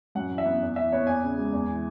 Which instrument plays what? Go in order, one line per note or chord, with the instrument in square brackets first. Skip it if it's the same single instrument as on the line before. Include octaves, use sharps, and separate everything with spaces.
[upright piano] F#2 F#5
E3
E5
B3
E2
E3 E5
B3 C#5
E2 G#5
C#3
G#3
E2
E3